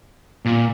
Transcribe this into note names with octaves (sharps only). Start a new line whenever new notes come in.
A#2